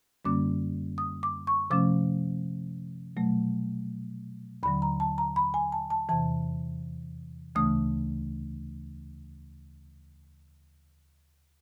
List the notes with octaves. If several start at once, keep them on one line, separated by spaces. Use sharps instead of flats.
F#2 D3 G3 A#3 C#4 D6
D#6
D6
C#6
C3 F3 A3 C#4 D6
B2 F#3 A3
D#2 D3 F#3 B5
A#5
A5
A#5
B5
G#5
A5
A5
E2 C3 E3 A5
D2 C#3 E3 A3 D#6